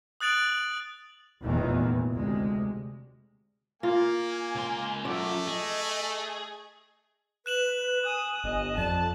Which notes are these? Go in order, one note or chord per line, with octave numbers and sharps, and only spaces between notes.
D#6 F#6 A6 D7 F7 F#7
F1 E2 A#2 D#3 E3 B3
D2 C3 G#3
A#3 F4 G#5
C#2 C6
F#2 A3 F4 D5
G#4 D#5
B4 F#6 E7 F#7
G#5 D#6
G1 D#5
F2 D5 A5